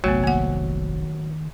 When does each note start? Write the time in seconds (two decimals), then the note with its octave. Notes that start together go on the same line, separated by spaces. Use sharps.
0.04 F1 A#1 F#3 A3 B3
0.24 D#3 A#3 F#5